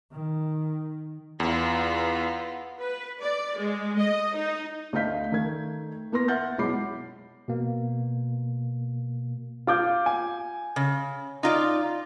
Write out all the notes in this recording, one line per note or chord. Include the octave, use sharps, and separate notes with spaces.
D#3
E2 B3 F4
B4
D5
G#3
D#5
D#4
D2 D4 D#5 F5 G6 B6
D#3 A3 G#6
A#3 B3 C6 A#6
E5 F#5 F6 G6 A6
B1 G#3 E4 B5 D6 C7
B2 A#3
F4 D6 G6
G#5
C#3
D#4 F4 D5